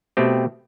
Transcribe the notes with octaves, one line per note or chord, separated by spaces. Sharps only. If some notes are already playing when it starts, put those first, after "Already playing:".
B2 A3 C4 G4